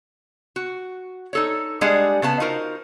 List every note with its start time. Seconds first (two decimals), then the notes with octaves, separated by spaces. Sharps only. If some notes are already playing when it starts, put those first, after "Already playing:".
0.56 F#4
1.33 D#4 A4 C#5
1.81 G3 G#3 D4 G#4 F#5
2.22 C#3 B3 A5
2.40 D#4 F4 F#4 A#4 C5